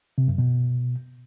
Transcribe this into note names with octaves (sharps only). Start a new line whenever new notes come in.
C3
F#2
B2